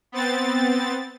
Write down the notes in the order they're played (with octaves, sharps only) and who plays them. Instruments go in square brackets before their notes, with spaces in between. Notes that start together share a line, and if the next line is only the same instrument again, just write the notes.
[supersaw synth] B3 C4 A6